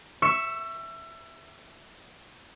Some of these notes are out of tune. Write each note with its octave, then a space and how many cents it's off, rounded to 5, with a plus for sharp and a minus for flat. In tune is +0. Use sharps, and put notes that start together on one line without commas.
E5 +0 C#6 +0 E6 +30